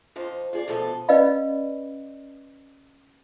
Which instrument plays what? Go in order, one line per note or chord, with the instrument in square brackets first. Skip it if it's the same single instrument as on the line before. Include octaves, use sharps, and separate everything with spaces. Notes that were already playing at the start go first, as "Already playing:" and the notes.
[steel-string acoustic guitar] F2 F3 D#4
F4 G#4 D5
D2 B2 F3 A4 D#5
[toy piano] C#4 B4 D5 D#5 F5 B5